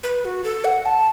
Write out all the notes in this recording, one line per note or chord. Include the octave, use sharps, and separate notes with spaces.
B4
F#4
A4
F#5
A5